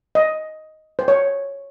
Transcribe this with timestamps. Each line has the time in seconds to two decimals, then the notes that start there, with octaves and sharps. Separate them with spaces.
0.15 D#5
0.99 C5
1.08 C#5